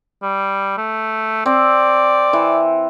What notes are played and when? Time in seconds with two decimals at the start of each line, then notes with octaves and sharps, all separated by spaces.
0.22 G3
0.78 A3
1.46 C4 D5
2.33 E3